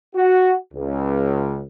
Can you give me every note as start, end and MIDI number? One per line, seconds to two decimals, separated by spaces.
0.15 0.54 66
0.74 1.64 37